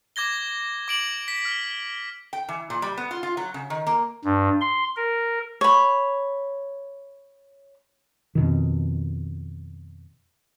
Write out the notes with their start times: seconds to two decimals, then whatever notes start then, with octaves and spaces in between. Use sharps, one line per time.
0.16 D6 G#6 A#6 G7
0.88 D6 D7 F#7
1.28 B6
1.45 F6
2.33 G5
2.49 E3
2.70 A#2
2.82 G3
2.97 B3
3.11 F4
3.23 F4
3.37 F#3
3.54 C#3
3.70 D#3
3.87 A#3
4.24 G2
4.61 C6
4.96 A#4
5.61 C#5 B5
8.35 F2 B2 D#3